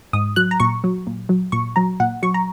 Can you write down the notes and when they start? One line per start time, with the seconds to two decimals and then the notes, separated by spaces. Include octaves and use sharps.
0.13 G#2 D#6
0.36 F#3 F#6
0.51 A#5
0.60 A#2 C#6
0.84 F#3
1.07 A#2
1.29 F#3
1.52 A#2 C#6
1.76 F#3 A#5
2.00 A#2 F#5
2.23 F#3 C#6
2.34 A#5